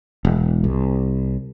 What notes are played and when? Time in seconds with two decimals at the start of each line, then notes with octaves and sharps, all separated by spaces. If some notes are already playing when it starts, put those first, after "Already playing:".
0.25 E1
0.64 C2